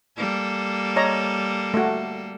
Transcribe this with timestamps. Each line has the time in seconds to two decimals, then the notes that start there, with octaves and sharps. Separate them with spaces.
0.17 G3 A#3 A4
0.96 C#5 D#5 A#5
1.74 A3 F#4